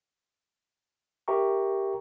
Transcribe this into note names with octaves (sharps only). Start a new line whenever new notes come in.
G4 A#4 E5 G5 A#5 C#6